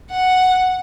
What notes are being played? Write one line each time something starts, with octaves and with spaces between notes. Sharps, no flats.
F#5